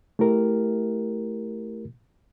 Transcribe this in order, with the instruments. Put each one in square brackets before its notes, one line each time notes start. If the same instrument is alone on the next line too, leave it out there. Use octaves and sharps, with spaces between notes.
[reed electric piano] A3 E4 G4 A#4